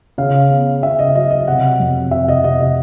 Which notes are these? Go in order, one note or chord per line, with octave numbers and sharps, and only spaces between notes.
C#3 F5
B3
C#3 E5
D#5
F#3 D#5
D#5
C3 F#5
F2
C3 E5
D#5
C3 D#5
D#5